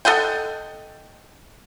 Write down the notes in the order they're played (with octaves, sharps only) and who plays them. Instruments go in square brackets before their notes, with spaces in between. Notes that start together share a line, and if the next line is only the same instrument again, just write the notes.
[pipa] A4 D#5 F#5 G5